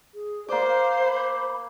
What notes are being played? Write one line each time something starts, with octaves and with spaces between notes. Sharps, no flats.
G#4
A#3 C5 D5 D6
F5
B5